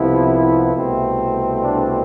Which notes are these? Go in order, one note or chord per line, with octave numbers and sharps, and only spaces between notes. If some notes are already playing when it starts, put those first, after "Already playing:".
Already playing: C2 C3 F3 B3 E4
C2 B2 A3 C4
D4